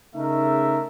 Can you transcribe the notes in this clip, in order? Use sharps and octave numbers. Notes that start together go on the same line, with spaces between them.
C#3 A3 D#4 A#4 E5